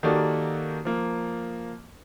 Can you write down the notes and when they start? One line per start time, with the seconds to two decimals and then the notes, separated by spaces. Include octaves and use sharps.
0.03 D#3 A#3 F#4 G4 A4 D5
0.85 F3 A#3